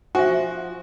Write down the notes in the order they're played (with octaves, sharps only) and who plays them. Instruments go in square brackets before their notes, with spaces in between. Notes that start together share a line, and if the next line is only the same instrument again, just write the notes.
[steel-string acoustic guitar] F3 [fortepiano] F#4 [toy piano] E5 G#5